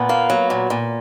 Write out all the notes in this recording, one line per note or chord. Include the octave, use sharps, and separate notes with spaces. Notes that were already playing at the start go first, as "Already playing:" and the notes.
Already playing: A#2 B3
A#3
F#3
A#2
A#2